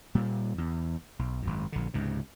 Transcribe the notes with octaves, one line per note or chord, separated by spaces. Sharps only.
A#2 G3 A#3
E2
B1
G#1 F#2
A#1 D3
C#2 G#2 C3